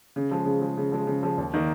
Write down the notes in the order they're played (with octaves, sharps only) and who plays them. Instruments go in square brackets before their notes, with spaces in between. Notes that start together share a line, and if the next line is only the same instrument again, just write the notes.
[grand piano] C#3
F3 G#3
C#3
F3 G#3
C#3
F3 G#3
C#3
F3 G#3
D#2
D#3 A#3